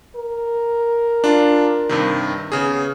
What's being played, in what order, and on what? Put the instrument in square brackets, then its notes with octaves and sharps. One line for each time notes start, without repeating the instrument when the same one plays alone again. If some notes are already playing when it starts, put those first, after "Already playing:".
[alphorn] A#4
[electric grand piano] D4 F4
G2 C3 D#3
[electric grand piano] C#3 G#4 [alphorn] B3